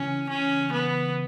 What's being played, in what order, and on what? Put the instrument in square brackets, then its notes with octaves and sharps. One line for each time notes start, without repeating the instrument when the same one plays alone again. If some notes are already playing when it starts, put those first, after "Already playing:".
Already playing: [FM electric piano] C#3 E3 [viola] C#4
[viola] C#4
B3